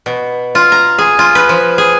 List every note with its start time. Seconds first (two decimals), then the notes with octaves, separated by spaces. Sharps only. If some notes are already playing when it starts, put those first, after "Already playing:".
0.06 B2
0.55 F4
0.72 A#5
0.98 G#4
1.19 F4
1.35 B4
1.49 F3
1.78 G#4